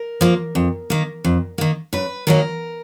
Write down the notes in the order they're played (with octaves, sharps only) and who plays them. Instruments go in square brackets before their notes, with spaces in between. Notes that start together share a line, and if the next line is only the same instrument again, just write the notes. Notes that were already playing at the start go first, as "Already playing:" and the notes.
Already playing: [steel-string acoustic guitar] A#4
F3 A#3
F2
D#3 A#3
F2
D#3 A#3
F#2 B4
D#3 F#3 A#3 A#4